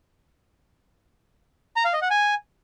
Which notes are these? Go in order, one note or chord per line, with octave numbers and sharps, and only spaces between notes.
A#5
F5
D#5
F#5
G#5